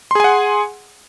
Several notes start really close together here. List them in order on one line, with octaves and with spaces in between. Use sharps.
C6 G#4 G#5 F#5